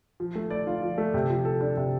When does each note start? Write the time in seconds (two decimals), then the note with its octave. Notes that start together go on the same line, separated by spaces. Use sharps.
0.20 F3
0.35 A3
0.50 D5
0.67 F4
0.82 F3
0.98 A3
1.14 C3
1.30 F3
1.45 A4
1.61 D4
1.77 C3